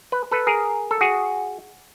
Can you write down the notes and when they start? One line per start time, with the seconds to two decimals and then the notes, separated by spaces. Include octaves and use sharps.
0.12 B4
0.31 A4 B4
0.47 G#4 A#4
0.91 A4
1.01 F#4 G#4